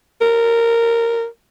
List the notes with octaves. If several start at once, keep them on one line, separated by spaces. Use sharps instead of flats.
A#4